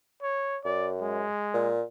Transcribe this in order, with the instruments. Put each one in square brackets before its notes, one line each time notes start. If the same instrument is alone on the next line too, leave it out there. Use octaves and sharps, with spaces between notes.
[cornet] C#5
[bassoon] F#2 [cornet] D5
[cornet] G#3
[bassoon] A#2